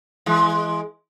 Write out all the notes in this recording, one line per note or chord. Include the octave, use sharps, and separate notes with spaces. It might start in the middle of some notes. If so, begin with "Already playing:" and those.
E3 G#3